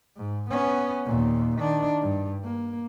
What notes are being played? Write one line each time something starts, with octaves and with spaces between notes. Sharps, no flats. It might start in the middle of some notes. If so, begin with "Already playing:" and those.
G#2
B3 C#4
D#2 A#2
D#3 D4
G2
A#3